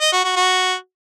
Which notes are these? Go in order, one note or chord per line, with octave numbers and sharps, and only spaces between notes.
D#5
F#4
F#4
F#4